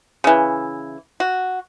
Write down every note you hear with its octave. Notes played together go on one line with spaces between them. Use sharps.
C#3 E3
F#4